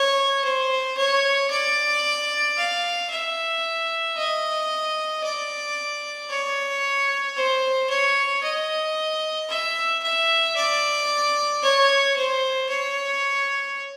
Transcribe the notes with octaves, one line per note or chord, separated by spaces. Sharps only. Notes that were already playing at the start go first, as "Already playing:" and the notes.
Already playing: C#5
C5
C#5
D5
F5
E5
D#5
D5
C#5
C5
C#5
D#5
E5
E5
D5
C#5
C5
C#5